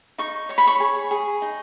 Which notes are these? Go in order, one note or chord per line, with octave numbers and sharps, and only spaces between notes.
D#4 C#6
C#5 C#6
B5
C#6
G#4
G#4
D#4